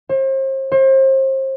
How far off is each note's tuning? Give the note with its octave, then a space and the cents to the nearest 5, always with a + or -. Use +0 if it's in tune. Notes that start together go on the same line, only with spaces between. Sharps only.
C5 +40
C5 +35